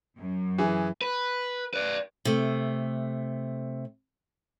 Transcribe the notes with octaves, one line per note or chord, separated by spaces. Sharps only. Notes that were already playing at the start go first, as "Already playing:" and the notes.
F#2
E3 G#4
B4
B4 D5
C3 A3